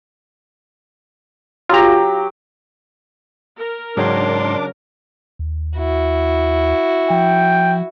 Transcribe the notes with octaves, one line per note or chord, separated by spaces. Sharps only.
F#3 F4 G4 A#5
A#4
G#2 C#3 F#3 D4 G5 C6 D6
D#2
E4 F#4
F3 G5